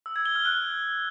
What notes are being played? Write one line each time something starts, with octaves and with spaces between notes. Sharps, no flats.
E6
G#6
G7
F6
F#6